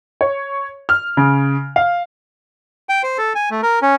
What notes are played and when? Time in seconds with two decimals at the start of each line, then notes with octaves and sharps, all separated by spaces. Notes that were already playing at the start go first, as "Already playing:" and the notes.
0.21 C#5
0.89 F6
1.17 C#3
1.76 F5
2.89 G5
3.03 C5
3.18 A4
3.35 G#5
3.51 A3
3.63 A#4
3.82 C#4